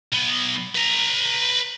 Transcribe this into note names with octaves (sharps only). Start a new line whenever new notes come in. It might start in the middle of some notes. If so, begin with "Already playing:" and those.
B1 B3
B4 A#5